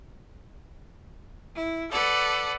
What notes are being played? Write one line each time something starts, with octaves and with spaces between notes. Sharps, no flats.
E4
A4 B4 D5 F#5